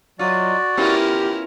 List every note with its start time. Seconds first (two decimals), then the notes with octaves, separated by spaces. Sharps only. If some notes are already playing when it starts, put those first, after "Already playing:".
0.19 F#3 F4 F#4 D5 D#5
0.77 B3 C#4 E4 F4 G4 A#4